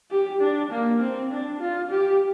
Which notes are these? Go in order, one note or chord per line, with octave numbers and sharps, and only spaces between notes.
G4
D4
A#3
C4
D4
F4
G4